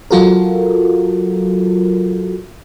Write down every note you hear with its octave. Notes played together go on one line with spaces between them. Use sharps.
F#3 F4 F#4 A4 A#4